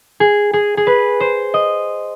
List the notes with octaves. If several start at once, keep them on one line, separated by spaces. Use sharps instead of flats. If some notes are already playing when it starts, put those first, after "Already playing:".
G#4
G#4
G#4
B4
C5
D#5